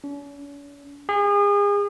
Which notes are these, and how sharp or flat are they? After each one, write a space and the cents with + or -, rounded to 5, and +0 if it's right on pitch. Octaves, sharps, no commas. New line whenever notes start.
C#4 +45
G#4 -35